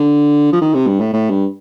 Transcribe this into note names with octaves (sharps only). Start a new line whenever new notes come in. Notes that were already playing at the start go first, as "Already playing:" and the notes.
Already playing: D3
F3
D#3
C3
G2
A2
A2
G2